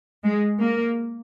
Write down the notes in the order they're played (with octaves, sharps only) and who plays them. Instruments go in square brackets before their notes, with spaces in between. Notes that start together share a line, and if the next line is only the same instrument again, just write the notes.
[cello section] G#3
A#3